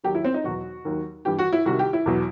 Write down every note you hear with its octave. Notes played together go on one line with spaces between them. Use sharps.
D#2 D#3 F#3 G4
E4
C4
D#4
E2 B2 F#3 F#4
D#2 D#3 F#3
G2 E3 G4
F#4
E4
C2 C3 D#3 F#4
G4
E4
E2 B2 F#3